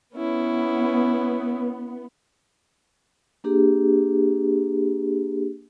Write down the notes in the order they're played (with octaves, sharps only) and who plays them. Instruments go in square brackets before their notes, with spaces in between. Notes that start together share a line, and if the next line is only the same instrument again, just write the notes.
[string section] B3 [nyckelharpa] C#4 E4
[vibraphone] A#3 D4 G4 G#4